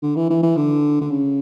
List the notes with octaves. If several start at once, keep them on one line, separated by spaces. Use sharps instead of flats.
D3
E3
E3
E3
D3
D3
C#3